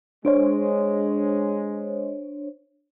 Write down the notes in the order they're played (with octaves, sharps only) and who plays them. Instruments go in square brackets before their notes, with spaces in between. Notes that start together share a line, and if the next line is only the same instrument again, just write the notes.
[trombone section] G#3 [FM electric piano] D4 C5 C#5